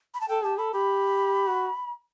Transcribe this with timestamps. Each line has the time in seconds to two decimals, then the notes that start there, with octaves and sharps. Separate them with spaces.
0.14 B5
0.21 A5
0.29 A4 G5
0.43 G4 A5
0.58 A4 B5
0.73 G4 B5
1.47 F#4